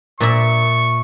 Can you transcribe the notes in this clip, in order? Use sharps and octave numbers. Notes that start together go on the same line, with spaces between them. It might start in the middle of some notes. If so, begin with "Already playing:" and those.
A#2 D5 E5 C#6